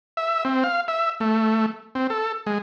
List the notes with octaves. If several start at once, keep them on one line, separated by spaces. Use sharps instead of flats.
E5
C4
F5
E5
A3
C4
A4
G#3